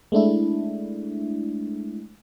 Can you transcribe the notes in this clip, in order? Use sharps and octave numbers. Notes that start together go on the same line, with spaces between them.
G#3 A3 D4 E4